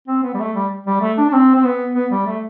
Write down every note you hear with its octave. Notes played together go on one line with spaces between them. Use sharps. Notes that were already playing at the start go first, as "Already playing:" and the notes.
C4
B3
G3
A3
G3
G3
A3
D4
D4
C4
C4
B3
B3
G3
A3